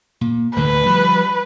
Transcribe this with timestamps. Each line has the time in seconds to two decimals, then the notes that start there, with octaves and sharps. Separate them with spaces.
0.21 A#2
0.56 D2 A2 D3 B4
0.86 F3 G3